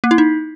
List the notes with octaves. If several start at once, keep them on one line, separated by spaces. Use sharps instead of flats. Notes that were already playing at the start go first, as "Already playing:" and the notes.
A#3
E4
D#4